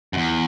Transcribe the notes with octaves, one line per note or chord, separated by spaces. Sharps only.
F#2
E2